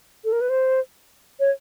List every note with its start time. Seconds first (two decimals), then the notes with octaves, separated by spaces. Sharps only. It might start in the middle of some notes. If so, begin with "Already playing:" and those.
0.25 A4
0.32 A#4
0.41 B4
0.49 C5
1.40 C#5